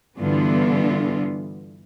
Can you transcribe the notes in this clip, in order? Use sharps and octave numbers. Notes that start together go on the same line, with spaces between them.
G2 D3 E3 B3 F4